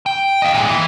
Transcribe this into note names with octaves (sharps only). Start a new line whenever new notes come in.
G5
D#5 F5
A#2 G#3
E3